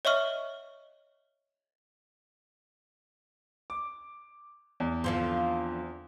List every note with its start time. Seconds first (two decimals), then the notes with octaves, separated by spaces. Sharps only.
0.05 C#5 D#5 E5 C#6 F6
3.70 D6
4.80 E2
5.04 D3 F3 C4